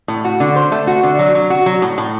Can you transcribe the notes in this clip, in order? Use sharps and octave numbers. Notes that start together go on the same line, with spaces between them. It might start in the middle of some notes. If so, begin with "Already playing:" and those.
A2
F#4
D3
C5
A3
F#4
D3
F#3
F#3
F#4
F#3
A2
A2